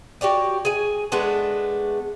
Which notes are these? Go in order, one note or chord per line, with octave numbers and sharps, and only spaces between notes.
F#4 G4 C#5 D5
G#4 G#5
G#3 A3 B3 D4